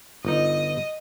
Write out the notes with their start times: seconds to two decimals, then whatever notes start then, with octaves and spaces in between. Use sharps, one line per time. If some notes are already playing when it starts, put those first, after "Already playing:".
0.25 G1 D#4 D#5